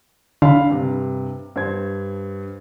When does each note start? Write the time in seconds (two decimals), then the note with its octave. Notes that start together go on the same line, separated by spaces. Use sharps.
0.42 D3 F5 B5
0.70 G2 C3
1.56 G2 C5 G#6